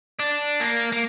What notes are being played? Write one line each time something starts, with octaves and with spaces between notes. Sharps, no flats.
D4
A#3
A#3